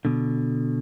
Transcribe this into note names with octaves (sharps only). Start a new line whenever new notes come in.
B2 D3